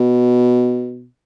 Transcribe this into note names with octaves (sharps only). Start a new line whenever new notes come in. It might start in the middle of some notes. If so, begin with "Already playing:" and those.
Already playing: B2